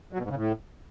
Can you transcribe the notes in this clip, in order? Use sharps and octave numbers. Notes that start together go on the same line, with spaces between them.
F#3
B2
G#2
C#3
A2